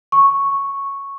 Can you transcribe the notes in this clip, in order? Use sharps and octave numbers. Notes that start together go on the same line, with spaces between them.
C#6